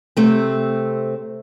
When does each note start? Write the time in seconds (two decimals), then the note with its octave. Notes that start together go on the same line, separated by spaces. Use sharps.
0.17 C3 A3 C4